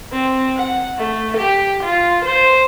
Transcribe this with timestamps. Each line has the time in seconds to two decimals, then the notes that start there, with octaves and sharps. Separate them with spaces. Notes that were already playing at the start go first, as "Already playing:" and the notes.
0.12 C4
0.56 F#5
0.98 A3
1.37 G4
1.84 F4
2.26 C5